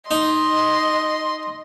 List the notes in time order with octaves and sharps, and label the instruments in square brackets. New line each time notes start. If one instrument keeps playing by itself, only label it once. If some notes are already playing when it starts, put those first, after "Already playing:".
[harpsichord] D#4 [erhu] D#5 [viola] C6